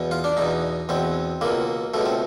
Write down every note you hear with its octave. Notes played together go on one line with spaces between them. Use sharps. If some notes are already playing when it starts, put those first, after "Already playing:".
Already playing: E2 B2
F4
D4
E2 B2 D#4
E2 B2 C4
C#2 B2 A#3
C#2 B2 A3
C4